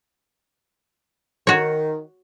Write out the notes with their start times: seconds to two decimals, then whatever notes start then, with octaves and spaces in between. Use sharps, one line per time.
1.47 D#3 F#4 C#5